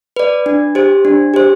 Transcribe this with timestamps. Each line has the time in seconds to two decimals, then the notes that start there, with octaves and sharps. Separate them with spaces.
0.16 B4 D5
0.46 D4
0.75 G4 C5
1.05 D4
1.34 G4 C5